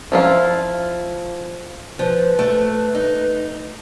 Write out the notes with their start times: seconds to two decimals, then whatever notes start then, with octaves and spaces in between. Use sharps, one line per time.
0.12 F3 E4 F4
1.99 F3 B4
2.39 A3
2.95 D#4